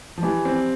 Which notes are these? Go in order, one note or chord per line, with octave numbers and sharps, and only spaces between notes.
F3
E3 G3
C4